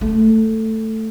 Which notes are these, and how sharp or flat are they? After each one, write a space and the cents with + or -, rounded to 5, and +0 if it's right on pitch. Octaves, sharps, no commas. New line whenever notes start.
A3 +5